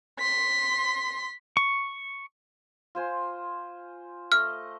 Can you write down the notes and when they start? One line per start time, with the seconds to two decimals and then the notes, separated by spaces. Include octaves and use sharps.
0.19 C6 B6
1.57 C#6
2.95 F4 C5 G#5
4.32 A3 D#5 F6